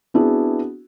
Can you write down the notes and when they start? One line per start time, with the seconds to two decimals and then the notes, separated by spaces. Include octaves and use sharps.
0.14 B3 C4 D4 E4 F#4 G#4